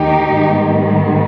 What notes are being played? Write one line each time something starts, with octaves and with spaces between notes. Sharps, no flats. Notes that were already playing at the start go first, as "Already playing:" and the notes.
Already playing: D#2 D#3 A#3 D#4 G4
G#2 D#3 G3 B3